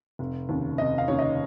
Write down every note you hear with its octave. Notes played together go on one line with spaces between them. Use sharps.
F1
D#2 C#3
F1 D#5
F5
D#2 C#3 C#5
D#5